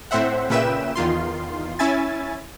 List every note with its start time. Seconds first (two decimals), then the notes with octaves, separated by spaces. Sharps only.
0.11 A2 C4 C5 E5 F#5
0.50 A#2 C#3 B4 E5 G5 E7
0.96 E2 D#3 F4 C6
1.79 C#4 E4 E5 G#5 A6